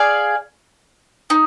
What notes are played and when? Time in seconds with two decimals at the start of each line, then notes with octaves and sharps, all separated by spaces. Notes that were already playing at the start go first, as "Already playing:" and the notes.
Already playing: G#4 D5 F5 G#5
1.30 D#4